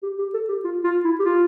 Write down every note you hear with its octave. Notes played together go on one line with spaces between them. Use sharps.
G4
G4
A4
G4
F4
F4
E4
G4
F4